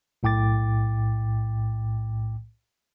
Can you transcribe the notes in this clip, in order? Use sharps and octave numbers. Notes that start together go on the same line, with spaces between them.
B1 A2 G5 D6 A6